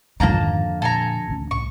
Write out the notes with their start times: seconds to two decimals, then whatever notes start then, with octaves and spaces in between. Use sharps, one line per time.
0.20 F2 G#2 D3 D#3 A#3 A5 A#5
0.82 A#2 A4 G#5 A#5
1.27 A1 D2 C#4
1.51 C2 A2 C#6